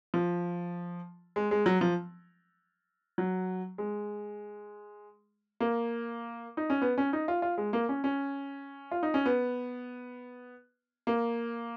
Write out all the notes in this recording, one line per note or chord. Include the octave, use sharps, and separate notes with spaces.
F3
G#3
G#3
F#3
F3
F#3
G#3
A#3
D#4
C#4
B3
C#4
D#4
F4
F4
G#3
A#3
C#4
C#4
F4
D#4
C#4
B3
A#3